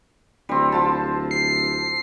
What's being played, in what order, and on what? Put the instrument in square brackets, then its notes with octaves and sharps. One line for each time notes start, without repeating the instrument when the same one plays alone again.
[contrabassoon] D1 [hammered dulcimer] G3 C4
[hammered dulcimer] F3 F4 A5
[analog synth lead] C7